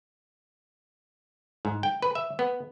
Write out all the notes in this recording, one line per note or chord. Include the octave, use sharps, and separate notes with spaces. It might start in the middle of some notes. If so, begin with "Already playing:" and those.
G#2
G5
B4
E5
B3